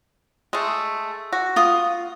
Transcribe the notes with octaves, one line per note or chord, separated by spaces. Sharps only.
G#3 A3 G#4
F#4
F4 D#6